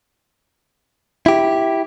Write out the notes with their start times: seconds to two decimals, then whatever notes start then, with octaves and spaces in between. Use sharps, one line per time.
1.26 E4 G4